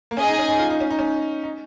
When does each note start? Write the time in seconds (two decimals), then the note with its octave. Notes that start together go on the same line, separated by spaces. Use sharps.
0.11 A#3
0.17 C#4 G#4 D#5 G#5
0.27 D#4
0.38 C#4
0.49 D#4
0.59 F4
0.70 D#4
0.80 C#4
0.90 D#4
0.99 C#4
1.44 D#4